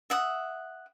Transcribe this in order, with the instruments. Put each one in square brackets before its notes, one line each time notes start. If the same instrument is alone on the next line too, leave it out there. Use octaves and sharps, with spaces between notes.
[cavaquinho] E5 F#5 D#6